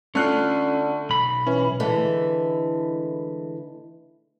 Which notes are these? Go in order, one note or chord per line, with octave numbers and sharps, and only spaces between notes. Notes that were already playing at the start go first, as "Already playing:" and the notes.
D3 A3 C#4 F4 F#6
B1 B5
E3 C#4
D3 E3 G#3 A3 E4